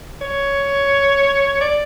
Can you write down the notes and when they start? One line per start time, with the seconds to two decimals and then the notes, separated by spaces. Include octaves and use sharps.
0.21 C#5
1.61 D5